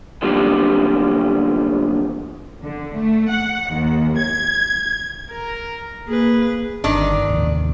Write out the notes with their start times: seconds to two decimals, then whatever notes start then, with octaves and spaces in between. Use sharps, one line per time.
0.22 E2 A#2 D3 F#3 G3 D#4
2.64 D3
2.95 A3
3.31 F#5
3.71 D#2
4.18 G#6
5.32 A#4
6.08 A#3 G#4 B4
6.84 G1 D#3 D4
7.29 A1 D#2